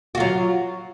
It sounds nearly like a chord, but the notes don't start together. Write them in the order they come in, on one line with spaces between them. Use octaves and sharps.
F#4 F4 F#3